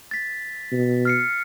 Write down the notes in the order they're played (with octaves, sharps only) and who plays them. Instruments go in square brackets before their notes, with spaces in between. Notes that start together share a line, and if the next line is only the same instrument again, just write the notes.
[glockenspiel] A6 B6
[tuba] B2
[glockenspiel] F6 C7 C#7